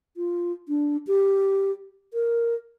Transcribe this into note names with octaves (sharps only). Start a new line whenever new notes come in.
F4
D4
G4
A#4